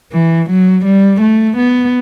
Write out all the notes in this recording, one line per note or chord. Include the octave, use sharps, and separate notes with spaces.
E3
F#3
G3
A3
B3